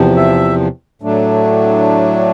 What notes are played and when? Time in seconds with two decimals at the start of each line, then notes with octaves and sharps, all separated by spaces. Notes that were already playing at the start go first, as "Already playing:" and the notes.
Already playing: E2 C3 F3
0.16 E5
1.02 A2 F#3 A3 D4